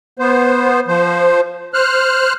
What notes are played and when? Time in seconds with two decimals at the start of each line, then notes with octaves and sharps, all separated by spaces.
0.19 B3 C5
0.88 F3 C5
1.74 C5 F6 F#6